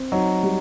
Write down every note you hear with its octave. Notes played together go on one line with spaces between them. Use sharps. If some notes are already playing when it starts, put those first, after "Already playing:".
Already playing: C4
F#3 D#4
G3